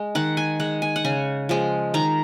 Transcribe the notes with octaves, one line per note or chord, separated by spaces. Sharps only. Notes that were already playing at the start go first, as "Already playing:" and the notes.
Already playing: G#3
D#3 F#5
G#5
G#3 F#5
G#5
F#5
C#3 G#5
F3 G#3
D#3 A#5